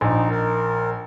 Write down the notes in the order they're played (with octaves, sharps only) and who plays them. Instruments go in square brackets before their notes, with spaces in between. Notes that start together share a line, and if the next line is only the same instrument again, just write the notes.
[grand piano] A#1 [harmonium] D#4
[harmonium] A#4